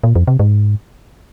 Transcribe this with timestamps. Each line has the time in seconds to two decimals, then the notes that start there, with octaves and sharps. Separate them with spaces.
0.04 A#2
0.16 F2
0.28 C3
0.39 G#2